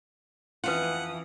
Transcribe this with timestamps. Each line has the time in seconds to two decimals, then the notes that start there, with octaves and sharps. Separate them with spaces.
0.64 F2 E3 C#4 F4 B4 F#5 D#6